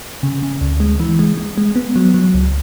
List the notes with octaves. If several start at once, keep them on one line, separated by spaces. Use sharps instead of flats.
C#3
C#3
D2
G#3
E3
G#3
G#3
G#3
B3
F#3
F#3
C#2